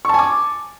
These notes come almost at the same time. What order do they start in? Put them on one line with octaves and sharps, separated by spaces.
C#6 A5 G#5 D6